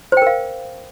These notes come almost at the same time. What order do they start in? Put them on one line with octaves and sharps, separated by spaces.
C5 G5 A#4 F5